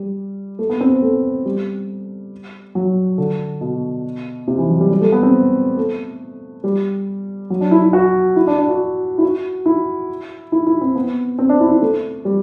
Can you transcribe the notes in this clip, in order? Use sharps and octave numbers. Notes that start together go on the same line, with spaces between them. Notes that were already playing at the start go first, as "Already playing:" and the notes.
Already playing: G3
A3
B3
C4
A3
G3
F#3
D3
B2
C3
E3
F#3
G3
G3
A3
B3
C4
A3
G3
F#3
D4
E4
E4
F#4
E4
D4
D4
F#4
E4
F#4
E4
E4
E4
C4
B3
C4
D4
E4
E4
A3
G3